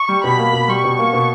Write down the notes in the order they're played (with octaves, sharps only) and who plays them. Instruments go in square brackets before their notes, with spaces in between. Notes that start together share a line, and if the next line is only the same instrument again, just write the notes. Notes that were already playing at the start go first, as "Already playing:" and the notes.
Already playing: [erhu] C#6
[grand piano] G3
[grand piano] B2 [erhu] B5
[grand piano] A#3
B2
[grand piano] G3 [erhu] C#6
[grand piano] B2
A#3
B2